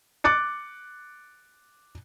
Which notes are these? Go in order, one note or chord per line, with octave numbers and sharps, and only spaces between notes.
D6 F#6 A6 C#7